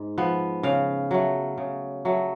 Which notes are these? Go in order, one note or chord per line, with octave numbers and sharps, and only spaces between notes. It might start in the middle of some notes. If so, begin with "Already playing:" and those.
Already playing: G#2
F3 B3
C#3 F5
F#3 A3
C#3
F#3 A3